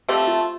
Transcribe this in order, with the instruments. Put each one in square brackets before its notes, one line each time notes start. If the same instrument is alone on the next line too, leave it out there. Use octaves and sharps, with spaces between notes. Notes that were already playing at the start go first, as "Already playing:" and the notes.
[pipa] F3 A3 C4 [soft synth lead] G4
[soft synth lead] F4